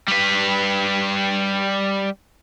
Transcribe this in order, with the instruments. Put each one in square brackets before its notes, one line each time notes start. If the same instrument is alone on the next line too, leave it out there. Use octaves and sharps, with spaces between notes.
[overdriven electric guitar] G3 B4